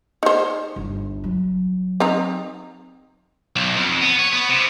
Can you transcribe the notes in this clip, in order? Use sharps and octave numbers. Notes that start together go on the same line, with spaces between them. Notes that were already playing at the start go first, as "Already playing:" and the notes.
D#4 C5
G1
F#3
C4 D#4 A#5
B1
F2
B3
C#5
B3
C3